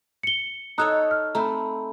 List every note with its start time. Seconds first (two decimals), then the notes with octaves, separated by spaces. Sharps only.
0.23 C#7 G7
0.78 D#4 A4 C#5 A#5 D#6 F#6
1.11 F6
1.35 A3 C4 A#5 B5